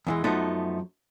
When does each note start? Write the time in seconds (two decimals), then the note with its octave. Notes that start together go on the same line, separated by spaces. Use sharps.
0.07 E2 E3 G#3
0.24 F#2 F3 A3 B3 D#4